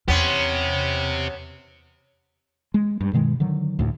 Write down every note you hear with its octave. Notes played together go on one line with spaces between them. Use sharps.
E2 B3 C#4 G4 C5
G#3
G2
G2 B2 D#3 G#3
D3 D#3 F#3
D2 A2